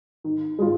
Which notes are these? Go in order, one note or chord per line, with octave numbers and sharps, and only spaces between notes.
D#3
G#3 F4